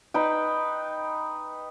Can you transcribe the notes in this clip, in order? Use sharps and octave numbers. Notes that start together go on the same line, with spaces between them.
D#4 B4 G5